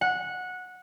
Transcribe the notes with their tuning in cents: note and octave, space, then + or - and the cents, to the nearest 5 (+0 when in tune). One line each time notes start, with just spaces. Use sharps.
F#5 -15